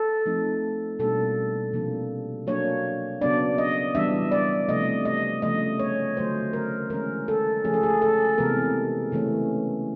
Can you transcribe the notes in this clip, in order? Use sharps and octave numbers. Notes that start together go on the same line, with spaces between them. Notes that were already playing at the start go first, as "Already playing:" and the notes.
Already playing: A4
F3 A3 C4 D#4
B2 G3 A#3 D4 A4
C3 F3 A#3 D4
F#3 A#3 D4 C#5
C#3 F#3 B3 D4 D5
D#5
E3 G3 B3 D4 E5
D5
C3 F3 A3 D#5
D#5
C#3 F3 A3 D#5
C#5
D3 F#3 A3 C#4 C5
A#4
E3 G#3 C#4 A#4
A4
C#3 F3 A3 C#4 G#4
A4
G#4
A4
C3 E3 G#3 B3 A#4
C#3 E3 A3 C#4